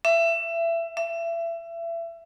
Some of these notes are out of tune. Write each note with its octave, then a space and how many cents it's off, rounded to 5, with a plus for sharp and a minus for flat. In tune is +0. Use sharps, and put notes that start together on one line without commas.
E5 +25
E5 +30